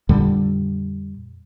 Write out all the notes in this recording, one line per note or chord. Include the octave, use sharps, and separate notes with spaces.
F2 A#2 D3 G3